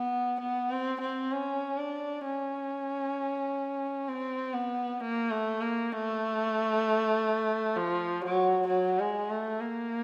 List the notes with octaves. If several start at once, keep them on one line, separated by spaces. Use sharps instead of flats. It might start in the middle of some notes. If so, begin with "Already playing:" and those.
Already playing: B3
B3
C4
C4
C#4
D4
C#4
C4
B3
A#3
A3
A#3
A3
F3
F#3
F#3
G#3
A3
A#3